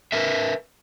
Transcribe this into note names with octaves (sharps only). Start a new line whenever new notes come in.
A#4 B4 E5